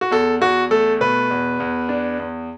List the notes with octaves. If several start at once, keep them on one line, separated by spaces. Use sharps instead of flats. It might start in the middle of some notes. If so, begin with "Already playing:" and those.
F#4
E2 A4
E2 F#4
A3 A4
B2 B4
E2
E2
D4
E2